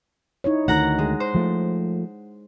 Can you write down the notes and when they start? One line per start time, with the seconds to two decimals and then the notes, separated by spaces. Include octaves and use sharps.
0.44 D#4 E4 C#5
0.68 D2 D#3 F#5 A#5 F#6
0.98 G#3
1.20 C5
1.35 F3 A3